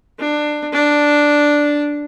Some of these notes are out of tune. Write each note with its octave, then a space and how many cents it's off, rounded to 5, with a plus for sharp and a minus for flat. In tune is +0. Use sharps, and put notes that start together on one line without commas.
D4 +20
D4 +0